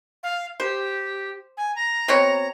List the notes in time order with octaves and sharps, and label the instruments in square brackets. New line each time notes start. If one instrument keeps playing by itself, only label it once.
[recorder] F5
[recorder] G4 [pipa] C5
[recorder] G#5
A#5
[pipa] B2 C4 C#5